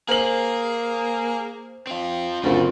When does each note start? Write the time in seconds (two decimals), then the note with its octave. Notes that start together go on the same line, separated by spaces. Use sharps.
0.09 A#3 G#4 C5 F#7
1.87 C4 F4
2.43 F#1 D2 A2 C4 F4